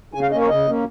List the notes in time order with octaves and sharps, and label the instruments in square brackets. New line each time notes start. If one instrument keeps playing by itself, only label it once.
[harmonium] C#3 G#5
F5
A#3 C#4 D#5
C#5
C#3 D#5
A#3 C#4